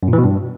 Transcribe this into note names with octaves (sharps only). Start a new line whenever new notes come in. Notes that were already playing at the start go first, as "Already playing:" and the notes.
F#2
A#2
E3
B2
G2